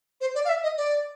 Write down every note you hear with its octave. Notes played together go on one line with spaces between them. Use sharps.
C5
D5
F5
E5
D#5
D5